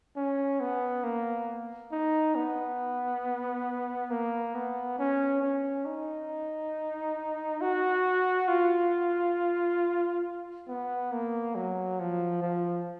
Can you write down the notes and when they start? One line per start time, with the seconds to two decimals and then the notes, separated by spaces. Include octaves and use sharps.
0.16 C#4
0.60 B3
1.04 A#3
1.92 D#4
2.35 B3
4.10 A#3
4.55 B3
4.98 C#4
5.42 C#4
5.86 D#4
7.61 F#4
8.48 F4
10.68 B3
11.12 A#3
11.55 F#3
12.00 F3
12.43 F3